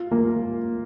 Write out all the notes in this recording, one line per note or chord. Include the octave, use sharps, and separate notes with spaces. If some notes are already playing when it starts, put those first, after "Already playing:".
Already playing: F4
A#3